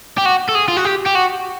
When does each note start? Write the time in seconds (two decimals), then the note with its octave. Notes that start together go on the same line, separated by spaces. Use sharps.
0.18 G4
0.25 F#4
0.49 A4
0.55 G#4
0.68 F4
0.77 F#4
0.85 G4
1.06 G4
1.15 F#4